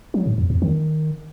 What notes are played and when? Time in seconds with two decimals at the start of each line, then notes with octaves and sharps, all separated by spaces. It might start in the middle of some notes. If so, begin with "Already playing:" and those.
0.14 F#3
0.26 G#2
0.38 E2
0.50 E2
0.62 D#3